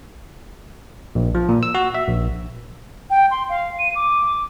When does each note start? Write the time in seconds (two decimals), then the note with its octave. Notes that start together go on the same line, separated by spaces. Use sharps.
1.15 A#1
1.35 F3
1.49 A#2
1.63 E6
1.75 F#4
1.95 E5
2.09 A#1
3.10 G5
3.31 C6
3.49 F5
3.79 D#7
3.95 D6